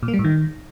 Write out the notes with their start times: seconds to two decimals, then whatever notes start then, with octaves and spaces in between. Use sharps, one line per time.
0.03 A#2
0.08 A#3
0.13 G3
0.19 A2
0.24 D#3